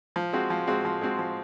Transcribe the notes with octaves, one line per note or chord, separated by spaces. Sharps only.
F3
G#3 C4 F#4
F3
G#3 C4 F#4
F3
G#3 C4 F#4
F3